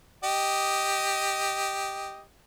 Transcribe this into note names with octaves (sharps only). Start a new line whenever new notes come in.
G4 D#5